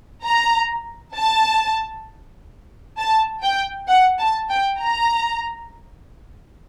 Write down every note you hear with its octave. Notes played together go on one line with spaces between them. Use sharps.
A#5
A5
A5
G5
F#5
A5
G5
A#5